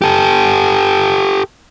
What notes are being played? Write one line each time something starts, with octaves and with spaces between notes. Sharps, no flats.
G4 A4